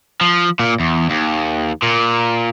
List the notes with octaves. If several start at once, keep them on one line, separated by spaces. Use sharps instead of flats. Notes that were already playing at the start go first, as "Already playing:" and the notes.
F3
A#2
E2
D#2
A#2